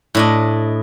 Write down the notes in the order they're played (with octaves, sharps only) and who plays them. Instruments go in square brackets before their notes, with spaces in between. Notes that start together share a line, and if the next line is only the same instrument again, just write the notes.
[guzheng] A2 D4 D#5